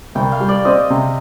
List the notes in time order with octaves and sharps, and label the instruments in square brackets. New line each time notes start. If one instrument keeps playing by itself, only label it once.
[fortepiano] C2 [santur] G5
[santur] F5
[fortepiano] G3
[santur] D5
[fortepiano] C4 [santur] D#5
[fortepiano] C3